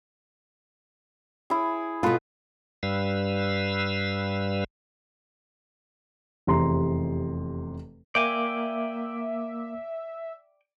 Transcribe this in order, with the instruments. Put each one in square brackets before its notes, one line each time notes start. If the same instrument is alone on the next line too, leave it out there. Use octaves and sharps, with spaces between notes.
[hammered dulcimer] E4 G#4
[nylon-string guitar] B2 F4 [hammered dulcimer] A4 B4
[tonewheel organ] G2 G3 B4 F5 E6
[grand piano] F1 E2 C3 A#5 C6
[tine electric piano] A#3 D6 [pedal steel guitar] D5 G5 G#5 [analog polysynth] E5